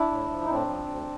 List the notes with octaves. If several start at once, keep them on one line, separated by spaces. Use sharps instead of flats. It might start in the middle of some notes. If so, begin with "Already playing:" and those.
Already playing: D4 E4
A2
F3
D#4
A2 C4 D4
F3
D2